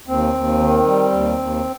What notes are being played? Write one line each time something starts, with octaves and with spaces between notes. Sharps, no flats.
D#2 C4
D#2
D#3
G3
D#2
D#2